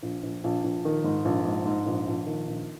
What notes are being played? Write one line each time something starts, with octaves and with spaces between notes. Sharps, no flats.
A#1
A#1
A#1
A#1
D#3
G#2
A#1
G#2
G#2
A#1
A#1
D#3
A#1